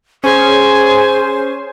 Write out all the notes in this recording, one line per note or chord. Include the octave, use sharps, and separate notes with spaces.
C#4 G#4 C5 G#5